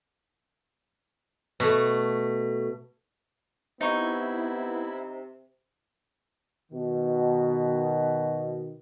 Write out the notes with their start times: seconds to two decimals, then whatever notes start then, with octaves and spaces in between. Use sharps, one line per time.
1.60 B2 A3
3.81 C3 B3 D#4 E4 C#6
6.72 B2 D#3